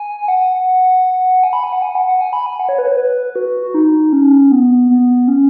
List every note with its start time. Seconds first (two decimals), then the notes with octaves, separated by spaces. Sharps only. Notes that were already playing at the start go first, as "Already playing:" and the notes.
Already playing: G#5
0.28 F#5
1.44 G#5
1.53 B5
1.64 G#5
1.72 F#5
1.82 G#5
1.95 F#5
2.07 F#5
2.21 G#5
2.33 B5
2.46 G#5
2.59 F#5
2.69 C#5
2.78 B4
2.87 C#5
2.97 B4
3.36 F#4
3.63 F#4
3.74 D#4
4.13 C#4
4.52 B3
4.90 B3
5.28 C#4